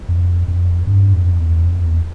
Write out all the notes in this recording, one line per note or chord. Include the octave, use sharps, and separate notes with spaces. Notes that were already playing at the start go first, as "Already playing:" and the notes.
F2
F2
G2
F2
E2
F2
E2